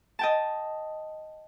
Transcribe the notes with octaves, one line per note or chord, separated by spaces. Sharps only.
D#5 G5 A5